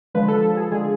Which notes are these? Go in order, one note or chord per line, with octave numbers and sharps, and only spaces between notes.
D3 F3 G#3 B4
A4
A4
G#4
D3 F3 G#3 G#4